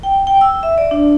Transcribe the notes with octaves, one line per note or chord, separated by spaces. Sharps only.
G5
G5
E6
E5
D5
D4